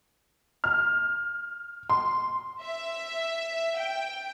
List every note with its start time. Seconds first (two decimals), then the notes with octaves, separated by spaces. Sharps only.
0.64 F6
1.90 C6
2.62 E5
3.77 G5